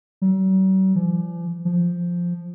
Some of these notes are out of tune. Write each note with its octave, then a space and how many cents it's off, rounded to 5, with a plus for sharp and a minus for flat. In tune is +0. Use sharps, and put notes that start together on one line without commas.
F#3 +45
F3 -45
F3 +0